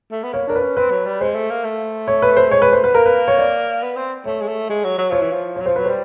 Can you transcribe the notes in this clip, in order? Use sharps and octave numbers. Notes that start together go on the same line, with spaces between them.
A3
B3
A#3 C#5
D4 A#4
B4
C#4
C4 B4
F#3
G3
G#3 C5
A3
A#3
A3
C#5
B4
C5
G#3 C#5
B4
A3 C5
B3 B4
A#3 A#4
B4
C#5
D5
B3
C4
A3 C#5
G#3
A3
G#3
F#3
F#3
F3 C#5
E3
F3
F#3 C#5
F3 C5
F#3 B4
G3 C5